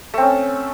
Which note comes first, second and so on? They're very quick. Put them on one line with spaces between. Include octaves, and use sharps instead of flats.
A3 C4 C#4